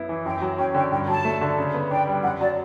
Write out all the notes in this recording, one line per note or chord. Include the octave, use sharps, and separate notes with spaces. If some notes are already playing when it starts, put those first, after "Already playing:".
Already playing: F#2 B3 E4
E3
F#2 G5
F#3
C#4 G5
D3 G5
G2 G5
F#3 A5
A3
D3
C#3
B3
D4 G5
G3
F#2 F#5
F#3 D5